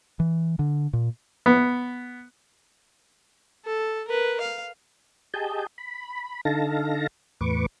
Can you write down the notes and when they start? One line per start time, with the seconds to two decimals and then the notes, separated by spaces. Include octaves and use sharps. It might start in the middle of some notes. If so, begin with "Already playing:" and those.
0.20 E3
0.59 D3
0.93 A#2
1.46 B3
3.65 A4
4.08 A#4 B4
4.41 F5
5.34 G4 G#4 D#5 G#5 A5 G6
5.78 B5
6.45 D3 D#4 A4 F5 A5 A#6
7.41 E2 A2 B4 C#6 D6